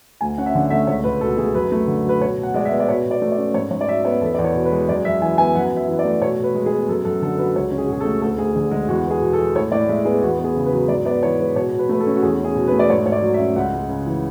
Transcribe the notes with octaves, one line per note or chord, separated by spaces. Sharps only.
D2 G#5
C#4 F#5
E5
D3 F#5
A3 E5
C#2 C#5
C#2 B4
B2 A4
A3 G#4
F#2 B4
A3
D3
F#3 B4
B2 C#5
B2
F#5
G#3 D5
E5
B3
D5
B2 C#5
B2
D5
A3
D5
C#4
G#2 C#5
G#2 C#5
D5
F#3 E5
B3 C#5
E2 A4
E2 D5
C#5
B2
B4
G#3
F#2 D5
F#2 E5
E3 G#5
B3 G#5
F#2 F#5
F#2
E5
E3
D5
A3
B2 C#5
B2 B4
G#3
G#4
B3
F#2 A4
F#2 A4
D3 A4
F#3 B4
C#2 C#5
C#4
G#4
F#4
B2 G#4
A4
A3
D2 A4
D2 G#4
D3 G#4
G#3 G#4
E2 F#4
B3 G#4
B2
A4
G#3
A2 C#5
A2 D5
G#3 E5
B3 G#4
E2 F#4
B3
G#4
C#3
B4
F#3
G#2 D5
B3 D5
E3 C#5
G#3 B4
B2 C#5
B2
B4
A3 B4
A4
C#4
F#4
E2 G#4
C#4 G#4
B2
B4
A3
D5
G#2 C#5
G#2 C#5
D5
F#3
E5
C#4
C#2 F#5
G#3
C#3
E3